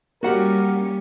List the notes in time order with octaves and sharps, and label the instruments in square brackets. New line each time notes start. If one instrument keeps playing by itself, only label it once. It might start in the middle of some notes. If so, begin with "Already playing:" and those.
[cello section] G3 C#4 [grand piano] A#3 G4 [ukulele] F#4 F#5 [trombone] A#4